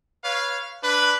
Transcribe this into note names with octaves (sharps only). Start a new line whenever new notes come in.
B4 C#5 F5
D4 B4